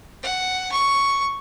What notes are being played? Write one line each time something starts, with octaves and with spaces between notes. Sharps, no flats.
F#5
C#6